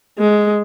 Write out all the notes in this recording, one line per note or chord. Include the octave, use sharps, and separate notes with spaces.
G#3